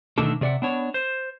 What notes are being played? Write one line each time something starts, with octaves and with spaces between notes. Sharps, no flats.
B2 D3 D#3 A3 D4 A4
C3 G#4 D5 E5 F#5
B3 D4 C#5
C5